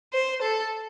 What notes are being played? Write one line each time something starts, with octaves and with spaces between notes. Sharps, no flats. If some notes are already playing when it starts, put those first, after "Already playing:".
C5
A4